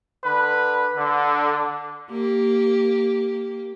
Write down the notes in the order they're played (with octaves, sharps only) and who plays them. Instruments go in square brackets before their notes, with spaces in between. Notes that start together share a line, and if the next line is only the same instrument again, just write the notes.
[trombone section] D3 B4
D3
[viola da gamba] A#3 G4